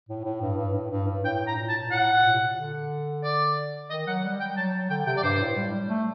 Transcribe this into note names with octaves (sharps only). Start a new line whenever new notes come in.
A2
A2
G2
G2
A2
G2
G2
A2 G5
A#5
A#2
A5
A#2
A2 F#5
A#2
C3
A#2
D3
D5
D#3 D#5
F#3 F#5
G3
G5
F#3 A5
F#3
D3 G5
C3 G5
D5
G2 C5
A2
G3
G3
A3